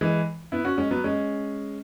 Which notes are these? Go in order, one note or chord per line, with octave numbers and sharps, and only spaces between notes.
E3 G#3
B3 E4
C#4 F#4
G#3 C#4
F#3 B3
G#3 C#4